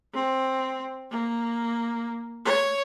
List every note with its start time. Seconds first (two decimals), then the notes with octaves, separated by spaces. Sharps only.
0.14 C4
1.11 A#3
2.45 C#5